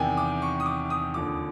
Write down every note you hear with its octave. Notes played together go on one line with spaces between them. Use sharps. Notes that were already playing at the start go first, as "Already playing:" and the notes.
Already playing: E2 C3 D#3 G5 G#5
D6
C#6
D#6
D6
D#6
D#2 D3 F3 D6